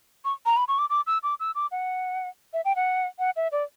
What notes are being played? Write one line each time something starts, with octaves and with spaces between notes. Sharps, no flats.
C#6
A#5
B5
C#6
D6
D6
E6
D6
E6
D6
F#5
E5
G5
F#5
F#5
E5
D5